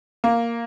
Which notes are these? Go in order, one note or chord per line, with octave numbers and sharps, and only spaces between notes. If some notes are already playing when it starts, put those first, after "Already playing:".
A#3